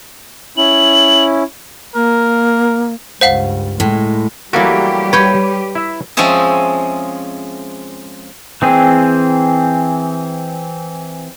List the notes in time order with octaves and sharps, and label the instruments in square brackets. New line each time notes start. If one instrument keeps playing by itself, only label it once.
[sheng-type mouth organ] C#4 E4 [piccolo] F#7
[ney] A#3 [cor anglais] A#4
[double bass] C#2 G2 [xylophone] C5 F5 F#5
[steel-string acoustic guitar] A2 [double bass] G#3
[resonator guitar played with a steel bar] E3 A3 [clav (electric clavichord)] F#3 A#3 F#4 [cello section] G3 G4
[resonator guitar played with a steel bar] B4 [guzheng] C#5 G5
[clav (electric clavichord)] E4 E5
[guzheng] F3 G#3 C4 C#4 G#4 E5
[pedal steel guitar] E3 C4 G#4